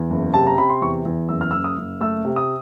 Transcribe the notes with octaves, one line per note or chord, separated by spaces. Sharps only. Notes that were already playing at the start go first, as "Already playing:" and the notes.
Already playing: E2
F#1
C3 A5
A#5
C3 B5
C6
E2 C#6
E2
F#1 E6
F6
F#1 E6
D#6
F#1
A3 E6
C3
D#6